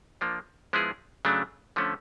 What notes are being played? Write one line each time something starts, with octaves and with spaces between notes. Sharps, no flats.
F3 A#3 D4
F3 G#3 B3 E4 G#4
C#3 F#3 A3 D4
D3 F3 A3 C#4